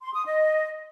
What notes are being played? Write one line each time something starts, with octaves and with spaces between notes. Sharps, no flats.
C6
D#6
D#5